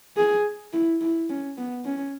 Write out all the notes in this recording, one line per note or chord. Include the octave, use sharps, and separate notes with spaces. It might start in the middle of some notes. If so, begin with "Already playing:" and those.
G#4
E4
E4
C#4
B3
C#4